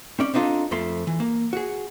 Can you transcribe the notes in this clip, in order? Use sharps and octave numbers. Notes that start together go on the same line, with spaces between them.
C4 C#4 D5
C4 D4 D#4 F4 A4
F2 F3 A3 C6
E3
A#3
F#4 G#4